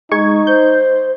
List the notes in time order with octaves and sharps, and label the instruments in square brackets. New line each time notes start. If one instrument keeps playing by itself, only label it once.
[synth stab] G#3 C#6 G#6 [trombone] D#4
[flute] C5 [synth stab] G6